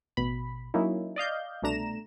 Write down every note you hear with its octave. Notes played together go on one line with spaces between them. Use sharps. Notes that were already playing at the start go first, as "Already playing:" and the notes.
A1 B2 B5
F#3 A#3 C#4 D#4 E4
D5 D#5 F5 G6
C2 B2 A3 D4 A#5 E7